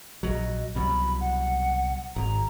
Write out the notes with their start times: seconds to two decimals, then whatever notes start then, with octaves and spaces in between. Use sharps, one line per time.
0.23 A#1 F#3 D#5
0.75 C2 B2 F#3 B5
1.20 F#5
2.16 G#1 A#5